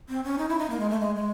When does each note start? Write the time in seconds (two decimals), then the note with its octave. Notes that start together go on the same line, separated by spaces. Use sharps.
0.09 C4
0.24 C#4
0.38 D#4
0.49 E4
0.59 D#4
0.70 A#3
0.80 G#3
0.90 A3
1.00 G#3
1.15 G#3